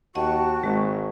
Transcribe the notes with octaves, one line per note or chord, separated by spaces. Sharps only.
D#2 F#4 D#5 F#5 G5 A5 C#6
G#1 G#3